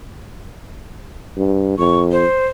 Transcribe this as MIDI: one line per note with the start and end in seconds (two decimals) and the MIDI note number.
1.37 1.78 43
1.78 2.25 41
1.78 2.01 85
2.12 2.47 72